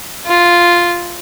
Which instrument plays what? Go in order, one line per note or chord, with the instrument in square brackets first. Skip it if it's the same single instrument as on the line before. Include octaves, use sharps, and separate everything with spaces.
[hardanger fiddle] F4